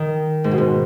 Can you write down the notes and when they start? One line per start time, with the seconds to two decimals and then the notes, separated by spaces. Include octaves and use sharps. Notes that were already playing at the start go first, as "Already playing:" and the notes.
Already playing: D#3
0.44 G#2
0.51 B2
0.58 G#2